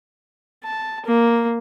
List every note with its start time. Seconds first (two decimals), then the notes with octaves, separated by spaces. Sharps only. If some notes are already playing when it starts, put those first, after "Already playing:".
0.64 A5
1.06 A#3